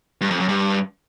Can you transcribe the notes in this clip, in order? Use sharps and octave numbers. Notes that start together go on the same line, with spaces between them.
G2
F2
F#2
G2